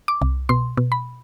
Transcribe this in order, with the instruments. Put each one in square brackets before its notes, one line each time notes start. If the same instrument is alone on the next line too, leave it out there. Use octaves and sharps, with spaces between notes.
[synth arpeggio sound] D6
C2
B2 C6
B2
B5